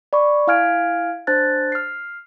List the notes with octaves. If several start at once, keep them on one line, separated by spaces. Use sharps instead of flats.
D5 B5 C#6
E4 F5 G#5 F6 G#6 D7
D4 C5 A5 F#6 A6
F6 C7